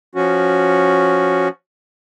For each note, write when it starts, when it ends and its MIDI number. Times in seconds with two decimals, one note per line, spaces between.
0.15 1.48 53
0.15 1.48 61
0.15 1.48 66